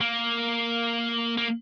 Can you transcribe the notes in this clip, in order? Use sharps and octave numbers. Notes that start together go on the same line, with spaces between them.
A#3
A#3